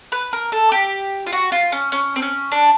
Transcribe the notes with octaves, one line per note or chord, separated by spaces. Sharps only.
B4
A#4
A4
G4
F4
F#4
F4
C#4
C#4
C4
C#4
D4